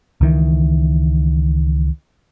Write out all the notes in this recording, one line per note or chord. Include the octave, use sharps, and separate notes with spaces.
C#2 D#3 E3